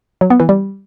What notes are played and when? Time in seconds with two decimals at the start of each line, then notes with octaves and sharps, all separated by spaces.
0.21 F#3
0.30 B3
0.40 E3
0.49 G3